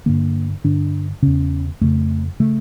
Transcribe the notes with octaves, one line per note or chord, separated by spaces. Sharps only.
G2 D3 A#3
G2 D3 D4
E2 C#3 C#4
F2 C#3 A3
C#3 A3